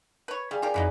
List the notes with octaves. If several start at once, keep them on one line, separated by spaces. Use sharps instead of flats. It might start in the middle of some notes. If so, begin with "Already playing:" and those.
B4 C#5
G3 G#4 F5 G#5
F4 G4 A#4 D5
F2 F#3 D#4 E4 B4 D6